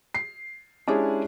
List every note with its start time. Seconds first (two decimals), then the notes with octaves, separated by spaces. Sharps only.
0.14 C7
0.87 G#3 C#4 D4 E4 G4 G#4